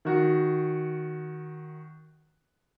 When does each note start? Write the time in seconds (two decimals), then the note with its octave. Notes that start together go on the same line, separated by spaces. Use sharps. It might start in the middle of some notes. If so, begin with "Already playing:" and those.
0.05 D#3 F#4